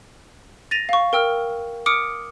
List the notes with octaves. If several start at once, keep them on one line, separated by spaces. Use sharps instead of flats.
A6 A#6 D#7 F7
F5 C#6
A#4 G5 E6 F6
D6 D#6 F6 C#7 D7